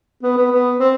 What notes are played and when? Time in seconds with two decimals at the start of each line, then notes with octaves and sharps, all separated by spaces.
0.23 B3
0.37 B3
0.52 B3
0.80 C4